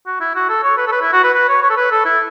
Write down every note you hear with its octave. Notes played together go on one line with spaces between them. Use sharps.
F#4
E4
F#4
A4
C#5
B4
A4
B4
E4
F#4
B4
B4
C#5
C#5
A4
B4
A4
E4